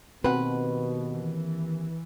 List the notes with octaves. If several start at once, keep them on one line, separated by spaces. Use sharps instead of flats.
D#2 B2 C4 B4 F#5
E3